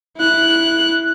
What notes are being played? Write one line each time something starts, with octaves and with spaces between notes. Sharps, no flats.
E4 F#6